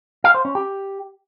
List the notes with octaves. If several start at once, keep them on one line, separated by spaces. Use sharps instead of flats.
F5
C5
C#4
G4